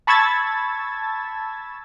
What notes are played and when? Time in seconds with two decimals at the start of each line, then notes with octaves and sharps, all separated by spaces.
0.07 A5 B5 C#6 E6 G#6 A6